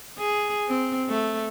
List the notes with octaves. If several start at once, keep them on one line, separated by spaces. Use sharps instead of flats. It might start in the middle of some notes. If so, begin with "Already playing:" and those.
G#4
C4
A3